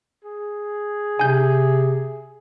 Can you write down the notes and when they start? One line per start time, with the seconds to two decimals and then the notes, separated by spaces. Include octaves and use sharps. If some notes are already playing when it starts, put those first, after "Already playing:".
0.24 G#4
1.19 C3 G#5 G6